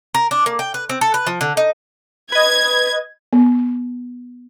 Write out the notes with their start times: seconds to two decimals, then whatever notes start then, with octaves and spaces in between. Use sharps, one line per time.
0.14 A#4
0.31 D4
0.46 A#3
0.59 G5
0.74 B4
0.89 C4
1.01 A4
1.14 B4
1.27 F3
1.41 D3
1.57 D#4
2.32 B4 D#5 G#6
3.33 B3